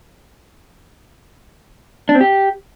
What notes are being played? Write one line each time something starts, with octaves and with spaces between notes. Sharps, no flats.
D4
C4
G4